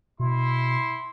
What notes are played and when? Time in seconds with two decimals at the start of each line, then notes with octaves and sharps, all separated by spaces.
0.19 B2 E4 C6